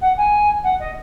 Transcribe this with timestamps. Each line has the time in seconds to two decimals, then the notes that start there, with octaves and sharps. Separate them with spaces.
0.01 F#5
0.17 G#5
0.64 F#5
0.80 D#5